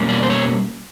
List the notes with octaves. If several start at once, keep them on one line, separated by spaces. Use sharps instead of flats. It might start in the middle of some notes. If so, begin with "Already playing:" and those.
Already playing: B2 G3 A#3 C#4
D5
C5
C#5